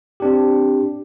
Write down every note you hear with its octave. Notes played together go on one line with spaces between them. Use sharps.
C4 D4 G4